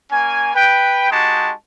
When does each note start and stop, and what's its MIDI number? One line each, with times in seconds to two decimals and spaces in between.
0.11 0.51 58
0.11 0.51 61
0.11 0.51 80
0.55 1.08 71
0.55 1.08 79
1.11 1.51 56
1.11 1.51 63
1.11 1.51 66
1.11 1.51 67
1.11 1.51 81